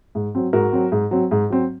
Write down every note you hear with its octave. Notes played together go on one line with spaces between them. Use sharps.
G#2
F#3 C4
G#2 F#4 A#4
F#3 C4
G#2
F#3 C4
G#2
F#3 C4